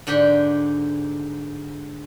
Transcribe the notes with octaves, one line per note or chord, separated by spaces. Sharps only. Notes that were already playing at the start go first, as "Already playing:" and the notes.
G#2 D3 G4